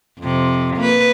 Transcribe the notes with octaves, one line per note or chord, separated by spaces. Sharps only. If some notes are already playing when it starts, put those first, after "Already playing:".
F2 C3
A#3 B4